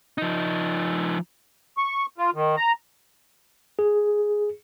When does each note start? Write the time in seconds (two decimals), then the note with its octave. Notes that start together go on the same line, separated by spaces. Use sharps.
0.18 F3 D#4
1.77 C#6
2.18 F4
2.34 D#3
2.57 A#5
3.79 G#4